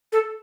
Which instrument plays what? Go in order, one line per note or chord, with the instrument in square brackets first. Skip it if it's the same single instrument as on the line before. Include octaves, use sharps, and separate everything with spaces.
[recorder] A4